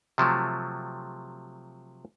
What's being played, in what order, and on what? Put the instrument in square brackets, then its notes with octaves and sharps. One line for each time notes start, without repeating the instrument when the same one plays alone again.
[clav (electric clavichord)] C3 F3 F#3 A3